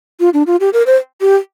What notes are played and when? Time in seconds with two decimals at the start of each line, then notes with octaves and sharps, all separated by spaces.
0.20 F4
0.34 D4
0.47 F4
0.60 G4
0.73 A#4
0.87 C5
1.21 G4